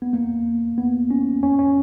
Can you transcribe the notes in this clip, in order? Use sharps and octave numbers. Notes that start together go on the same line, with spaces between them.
B3
A#3
B3
C#4
C#4
C#4